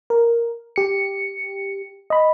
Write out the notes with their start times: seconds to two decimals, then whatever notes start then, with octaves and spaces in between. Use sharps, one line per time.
0.10 A#4
0.76 G4 C#7
2.10 D#5 B5